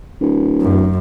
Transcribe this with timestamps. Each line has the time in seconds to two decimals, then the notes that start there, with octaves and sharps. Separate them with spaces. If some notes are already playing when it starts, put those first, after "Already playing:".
0.21 D1
0.61 F#2